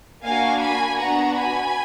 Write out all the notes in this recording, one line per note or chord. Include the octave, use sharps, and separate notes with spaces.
A#3 D4 F#4 F5 G#5
G#5 B5
B3 D4 F#4 F#5 A#5
G#5 B5